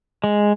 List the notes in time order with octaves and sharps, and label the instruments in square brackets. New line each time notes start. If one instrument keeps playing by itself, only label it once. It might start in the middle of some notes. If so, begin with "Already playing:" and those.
[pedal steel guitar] G#3